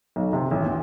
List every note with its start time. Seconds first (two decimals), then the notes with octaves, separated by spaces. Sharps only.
0.16 B1
0.33 C3
0.51 A1
0.65 D2